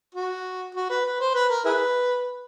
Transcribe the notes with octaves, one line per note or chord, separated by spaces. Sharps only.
F#4
F#4
B4
B4
C5
B4
A#4
E4 G#4 B4